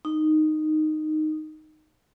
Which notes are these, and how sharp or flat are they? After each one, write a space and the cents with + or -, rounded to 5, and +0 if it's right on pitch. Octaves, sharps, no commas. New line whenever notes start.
D#4 -10